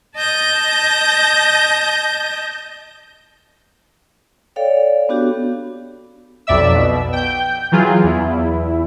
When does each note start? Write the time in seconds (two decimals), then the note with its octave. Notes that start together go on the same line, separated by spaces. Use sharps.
0.15 D#5 A5 G6 A#6
4.56 A4 C#5 D5 F5 G5
5.09 B3 D4 F#4 G4
6.47 B1 F2 D5 E5 E6
6.75 B2
7.13 G5 G6
7.72 E3 F#3 F4 G#4
8.04 E2 E4